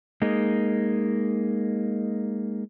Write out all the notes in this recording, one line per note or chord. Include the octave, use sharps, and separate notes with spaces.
G#3 A#3 D#4